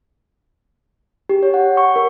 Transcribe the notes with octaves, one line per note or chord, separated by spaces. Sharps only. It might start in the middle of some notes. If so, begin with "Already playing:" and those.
G4
C#5
F#5
C#6
A#4